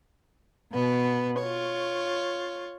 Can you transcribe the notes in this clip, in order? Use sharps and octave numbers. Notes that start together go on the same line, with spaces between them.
B2 B3
F4 C#5